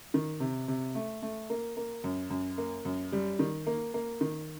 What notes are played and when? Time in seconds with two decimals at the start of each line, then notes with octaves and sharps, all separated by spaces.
0.14 D#3
0.40 C3
0.68 C3
0.95 A3
1.22 A3
1.50 A#3
1.77 A#3
2.04 F#2
2.30 F#2
2.58 A#3
2.85 F#2
3.12 G3
3.39 D#3
3.67 A#3
3.94 A#3
4.21 D#3